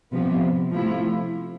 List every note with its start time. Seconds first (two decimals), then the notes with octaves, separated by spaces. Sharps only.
0.12 C3 F3 B3
0.71 C3 F3 A3 E4